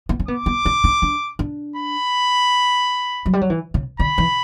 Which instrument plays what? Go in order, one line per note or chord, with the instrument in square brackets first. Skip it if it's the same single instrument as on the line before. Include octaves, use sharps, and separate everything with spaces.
[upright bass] B3
C#4
[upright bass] B3 [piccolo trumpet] D6
[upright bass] B3
C#4
D4
D4
D4
[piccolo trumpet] B5
[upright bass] F#3
G3
F#3
E3
C#3
[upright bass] D3 [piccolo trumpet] B5
[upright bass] E3